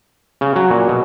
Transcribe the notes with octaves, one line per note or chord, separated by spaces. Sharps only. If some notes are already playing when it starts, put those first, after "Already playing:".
C#3
F#3
A#2
B2